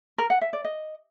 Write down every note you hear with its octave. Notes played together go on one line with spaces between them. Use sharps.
A#4
F#5
E5
D5
D#5